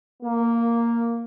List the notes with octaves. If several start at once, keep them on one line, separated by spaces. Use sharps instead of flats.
A#3